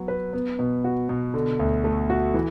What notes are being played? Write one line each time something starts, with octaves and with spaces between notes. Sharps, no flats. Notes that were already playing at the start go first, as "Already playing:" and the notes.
Already playing: F#3 B3 F#4
B4
B3
B2
F#4
B2
D3
D2
A3
F#4
E3